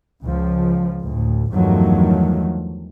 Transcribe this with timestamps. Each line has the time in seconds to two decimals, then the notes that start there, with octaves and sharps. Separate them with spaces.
0.22 C#2 F3
1.04 D2 A2
1.52 E2 G2 D#3 F3 F#3 A3